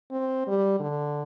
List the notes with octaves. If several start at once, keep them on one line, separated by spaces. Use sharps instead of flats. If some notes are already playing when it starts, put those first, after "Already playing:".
C4
G3
D3